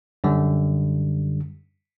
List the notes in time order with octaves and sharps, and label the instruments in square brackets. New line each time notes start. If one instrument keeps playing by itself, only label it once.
[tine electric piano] F#2 D3 G3